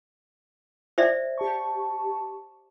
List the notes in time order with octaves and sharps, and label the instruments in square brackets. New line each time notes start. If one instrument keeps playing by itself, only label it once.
[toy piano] C5 D5 E5
[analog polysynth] G4 A5 C#6